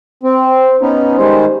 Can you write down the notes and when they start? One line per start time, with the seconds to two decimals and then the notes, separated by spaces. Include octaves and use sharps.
0.23 C4
0.82 B3 C#4 D#4
1.17 D#3 G3 G#3 C5